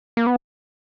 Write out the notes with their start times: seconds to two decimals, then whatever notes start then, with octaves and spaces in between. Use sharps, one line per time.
0.17 A#3
0.27 B3